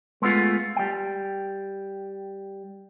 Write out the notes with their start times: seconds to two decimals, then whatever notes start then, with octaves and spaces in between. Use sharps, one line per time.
0.22 G#3 A3 B3 D4 F4
0.76 G3 G5